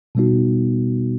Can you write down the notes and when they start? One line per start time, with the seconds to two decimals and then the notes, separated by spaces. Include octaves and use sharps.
0.15 B2 G3 B3 D#4 F#4